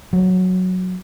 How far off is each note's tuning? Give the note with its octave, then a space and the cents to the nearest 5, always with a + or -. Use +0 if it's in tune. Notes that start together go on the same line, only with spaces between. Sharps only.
F#3 -5